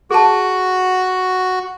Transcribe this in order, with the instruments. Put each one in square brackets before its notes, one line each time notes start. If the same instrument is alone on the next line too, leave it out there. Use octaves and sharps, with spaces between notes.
[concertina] F#4 [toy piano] G#4 A5